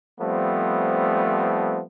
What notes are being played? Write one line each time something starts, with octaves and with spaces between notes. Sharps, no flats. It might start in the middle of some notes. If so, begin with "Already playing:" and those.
F3 G3 A3 B3 C4